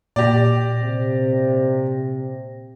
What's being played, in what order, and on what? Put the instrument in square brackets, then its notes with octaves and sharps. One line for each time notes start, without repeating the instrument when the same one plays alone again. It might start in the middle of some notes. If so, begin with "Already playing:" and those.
[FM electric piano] A#2 A#6 [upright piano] G4 D5
[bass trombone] C3